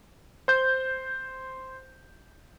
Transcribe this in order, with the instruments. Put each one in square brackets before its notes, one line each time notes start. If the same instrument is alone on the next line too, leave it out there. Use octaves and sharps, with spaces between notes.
[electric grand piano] C5 G6